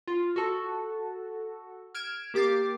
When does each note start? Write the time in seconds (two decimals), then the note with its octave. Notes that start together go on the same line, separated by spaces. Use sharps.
0.07 F4
0.36 F#4 A4
1.95 F6 G#6 D7 E7
2.34 A#3 G4 D6 A6 C7